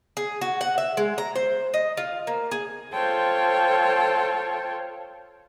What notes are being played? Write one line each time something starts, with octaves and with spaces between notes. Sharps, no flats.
G#4
F#4
F#5
E5
G#3
A#5
C5
D#5
F4
A#3
G#4
F4 A4 C5 C#5 G5